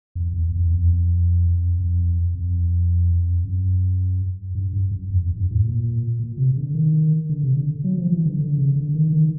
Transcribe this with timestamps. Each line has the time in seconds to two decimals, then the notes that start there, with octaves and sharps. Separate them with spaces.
0.15 F2
0.33 E2
0.52 E2
0.70 F2
1.80 F2
2.35 F2
3.45 F#2
4.55 G2
4.73 G2
4.91 F#2
5.10 F2
5.23 E2
5.38 G2
5.51 A2
5.64 A#2
6.19 A#2
6.38 C3
6.56 D3
6.75 D#3
7.29 D3
7.43 C3
7.57 D3
7.84 F#3
7.98 F3
8.12 E3
8.26 D3
8.39 D3
8.58 C#3
8.76 D3
8.94 D#3
9.12 D#3